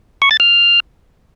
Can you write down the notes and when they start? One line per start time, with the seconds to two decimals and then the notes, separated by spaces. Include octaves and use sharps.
0.22 C#6
0.31 A6
0.40 F6